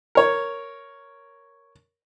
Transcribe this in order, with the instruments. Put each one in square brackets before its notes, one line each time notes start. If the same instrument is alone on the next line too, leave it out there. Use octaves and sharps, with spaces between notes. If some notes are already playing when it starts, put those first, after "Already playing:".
[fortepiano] A#4 C#5